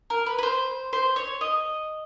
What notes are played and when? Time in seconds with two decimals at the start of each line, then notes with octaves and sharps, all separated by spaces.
0.10 A#4
0.26 B4
0.38 B4
0.43 C5
0.93 C5
1.16 C#5
1.41 D#5